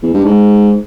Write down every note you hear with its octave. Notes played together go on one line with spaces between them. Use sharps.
E2
G2
G#2